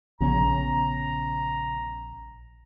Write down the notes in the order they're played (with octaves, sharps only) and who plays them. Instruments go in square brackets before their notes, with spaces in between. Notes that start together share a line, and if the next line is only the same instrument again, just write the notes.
[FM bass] A#1 [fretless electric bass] C#3 B3 C#4 [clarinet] A#5